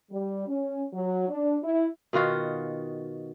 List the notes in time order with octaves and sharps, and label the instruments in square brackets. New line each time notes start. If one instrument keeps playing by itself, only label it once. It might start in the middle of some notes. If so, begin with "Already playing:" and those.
[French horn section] G3
C#4
F#3
D4
E4
[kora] B2 D#3 F4 F#4